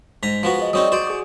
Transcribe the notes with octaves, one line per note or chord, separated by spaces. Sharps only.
G#2 A#5 B6
F3 B3 F#4
G#4 D#5
F#3 C4 D#4 D5 C#6 D#6
F#4 C5 D5 D#6
G#4 D6